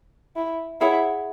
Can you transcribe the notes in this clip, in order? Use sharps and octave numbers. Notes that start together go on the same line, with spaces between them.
E4
E4 G#4 C#5 F#5